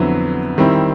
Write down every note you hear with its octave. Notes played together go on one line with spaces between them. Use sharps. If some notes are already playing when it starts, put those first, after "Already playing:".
Already playing: F2 D3 F#3 B3 E4
D#3 G3 C4 E4